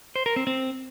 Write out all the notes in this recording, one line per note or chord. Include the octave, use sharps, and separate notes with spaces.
C5
A#4
C4
C4